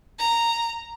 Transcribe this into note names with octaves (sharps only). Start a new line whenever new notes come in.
A#5